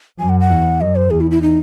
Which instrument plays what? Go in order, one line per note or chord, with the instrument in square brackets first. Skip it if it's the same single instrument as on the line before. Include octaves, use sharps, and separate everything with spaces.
[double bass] F#2 [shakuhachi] G#5
[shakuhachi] F#5
F#5
[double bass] E2
[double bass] F#2 [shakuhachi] D#5
[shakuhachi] C5
[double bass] E2 [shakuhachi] G#4
[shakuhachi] E4
E4
D#4